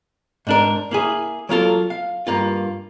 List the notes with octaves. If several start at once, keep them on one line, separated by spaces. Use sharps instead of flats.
G#2 D4 A#4
A#3 E4 G#4
F#3 A#3 F4 A4 A#4
F5
G2 A#3 F4